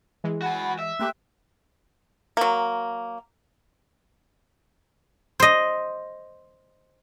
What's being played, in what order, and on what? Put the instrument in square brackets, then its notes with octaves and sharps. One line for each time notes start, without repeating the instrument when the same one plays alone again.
[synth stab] E3 G#3
[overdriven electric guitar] F#4 G#5 [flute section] F#5 B5
[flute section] D#5 [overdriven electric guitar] E5
[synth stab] A3 A#3 G4 [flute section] G5 C6 F#6
[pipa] F#3 A#3
[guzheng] C5 D#5